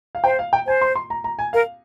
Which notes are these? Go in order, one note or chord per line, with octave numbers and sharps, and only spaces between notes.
F5
C5 G5
F5
G5
C5 G#5
C6
C6
A#5
A#5
G#5
A#4 F5